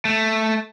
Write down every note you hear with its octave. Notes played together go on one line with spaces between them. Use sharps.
A3